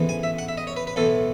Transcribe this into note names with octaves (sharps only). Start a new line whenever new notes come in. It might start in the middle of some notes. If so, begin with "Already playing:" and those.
Already playing: A1 G#2 E3 B3
G#5
E5
F#5
E5
D#5
C#5
B4
B4
B1 A2 E3 B3 A4